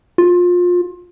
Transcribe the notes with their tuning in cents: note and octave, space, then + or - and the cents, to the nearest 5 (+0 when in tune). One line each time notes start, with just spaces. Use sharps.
F4 +25